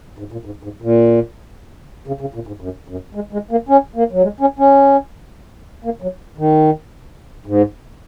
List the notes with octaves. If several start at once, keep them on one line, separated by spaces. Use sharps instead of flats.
G#2
A#2
G#2
G#2
A#2
C#3
C#3
A#2
G#2
F#2
F#2
G#3
G#3
A#3
C#4
A#3
F#3
G#3
C#4
C#4
A#3
F#3
D#3
G#2